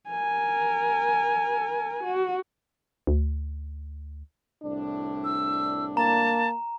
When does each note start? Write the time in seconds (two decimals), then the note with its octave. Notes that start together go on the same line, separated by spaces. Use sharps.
0.10 A#4 G#5
2.04 F#4
3.07 D2
4.62 C2 A2 D4
5.24 E6
5.97 A#3 A5 A#5